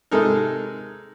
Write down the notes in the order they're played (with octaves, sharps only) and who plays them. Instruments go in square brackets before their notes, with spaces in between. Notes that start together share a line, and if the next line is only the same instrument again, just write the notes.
[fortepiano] C3 G#3 D#4 A4 A#4